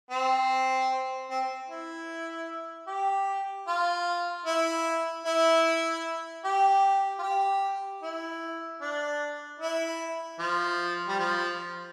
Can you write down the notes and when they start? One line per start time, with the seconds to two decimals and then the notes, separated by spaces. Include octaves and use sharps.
0.11 C4
1.30 C4
1.69 E4
2.88 G4
3.68 F4
4.46 E4
5.26 E4
6.45 G4
7.19 F4
7.23 G4
8.03 E4
8.81 D4
9.60 E4
10.39 F3
11.08 G3
11.19 F3